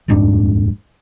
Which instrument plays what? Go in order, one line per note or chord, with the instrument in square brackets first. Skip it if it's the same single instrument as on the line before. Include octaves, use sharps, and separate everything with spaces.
[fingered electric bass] D#1 F2 G#2 D4